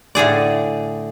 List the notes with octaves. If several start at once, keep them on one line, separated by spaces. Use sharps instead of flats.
A2 D3 G#4 D5